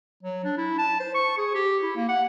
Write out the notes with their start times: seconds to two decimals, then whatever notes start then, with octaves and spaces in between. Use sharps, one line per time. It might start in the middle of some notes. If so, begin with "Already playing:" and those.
0.23 F#3
0.44 D4
0.57 E4
0.78 A5
1.00 C5
1.15 C#6
1.38 G#4
1.54 G4
1.83 E4
1.96 A#3
2.09 F#5